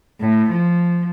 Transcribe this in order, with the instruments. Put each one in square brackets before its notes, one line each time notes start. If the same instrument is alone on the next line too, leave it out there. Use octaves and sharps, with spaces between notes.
[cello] A2
F3